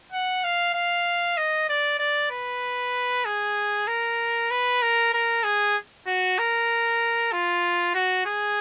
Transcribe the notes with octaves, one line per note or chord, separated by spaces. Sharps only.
F#5
F5
F5
D#5
D5
D5
B4
G#4
A#4
B4
A#4
A#4
G#4
F#4
A#4
F4
F#4
G#4